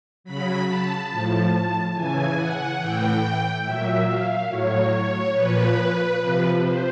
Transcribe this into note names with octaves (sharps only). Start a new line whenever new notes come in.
C#3 F#3 B5
A5
A2 F3
C#3 E3 G#5
F#5
A2 E3 G5
A#2 F#3 E5
F5
A2 F#3 C#5
C#5
A#2 F3 B4
C3 F3
C5